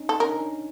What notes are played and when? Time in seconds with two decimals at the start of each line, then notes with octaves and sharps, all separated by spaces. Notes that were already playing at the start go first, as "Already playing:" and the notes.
Already playing: C#4 D#4
0.09 A4
0.20 C#4 D#4 A#4
0.29 D4
0.37 C#4 D#4